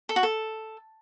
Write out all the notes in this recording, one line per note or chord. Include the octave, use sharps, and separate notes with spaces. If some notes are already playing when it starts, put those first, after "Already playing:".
A4
F#4
A4